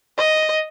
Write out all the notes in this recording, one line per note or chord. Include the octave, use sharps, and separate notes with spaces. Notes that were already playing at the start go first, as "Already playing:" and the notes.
D#5